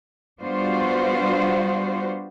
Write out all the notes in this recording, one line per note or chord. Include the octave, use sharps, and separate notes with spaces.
G3 B3 D4 F4 F#4 C5